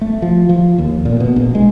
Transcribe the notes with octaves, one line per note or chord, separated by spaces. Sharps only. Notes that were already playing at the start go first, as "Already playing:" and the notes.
A3
F3
F3
D#2
A#2
B2
A#1
G#3